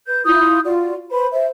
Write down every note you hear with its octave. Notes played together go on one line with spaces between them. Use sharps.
B4 G6
E4 F4 D#6 G6
F4 F#4 D5
B4 C5 B5
C5 E5